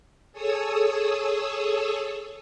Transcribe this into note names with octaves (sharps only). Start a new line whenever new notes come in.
G#4 A4 C#5 D#6 E6